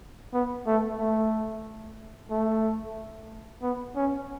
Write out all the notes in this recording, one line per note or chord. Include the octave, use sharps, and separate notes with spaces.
B3
A3
A3
A3
B3
C#4